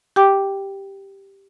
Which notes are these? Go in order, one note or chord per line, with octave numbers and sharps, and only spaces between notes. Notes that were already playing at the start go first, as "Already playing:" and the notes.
G4 G5 D6